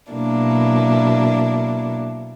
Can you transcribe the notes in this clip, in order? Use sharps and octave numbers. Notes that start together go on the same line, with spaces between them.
B2 F#3 A#3 D4 E4